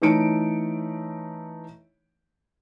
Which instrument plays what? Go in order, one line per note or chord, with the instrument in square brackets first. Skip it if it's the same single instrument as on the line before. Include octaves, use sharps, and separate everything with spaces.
[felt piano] E3 A3 D#4 C#5 C#7 D7